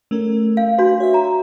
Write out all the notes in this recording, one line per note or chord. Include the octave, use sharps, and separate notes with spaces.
A3 C#4 A#4
F5
D4 F#4 B4
C#5 E5
A#5